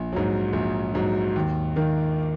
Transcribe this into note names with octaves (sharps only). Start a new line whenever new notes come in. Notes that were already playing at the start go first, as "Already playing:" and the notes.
Already playing: A#1
G#2 F#3
A#1
G#2 F#3
D#2
D#3 A#3